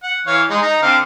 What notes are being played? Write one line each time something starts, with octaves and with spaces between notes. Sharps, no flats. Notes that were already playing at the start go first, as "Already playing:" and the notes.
F#5
E3 C#5 F5
G#3 D#4
D#4 A#5
D3 C4 F5